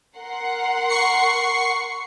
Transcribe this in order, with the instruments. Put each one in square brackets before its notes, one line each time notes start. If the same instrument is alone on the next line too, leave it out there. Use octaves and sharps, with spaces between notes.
[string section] A#4 F#5 C6
[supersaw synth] C#6 C7 C#7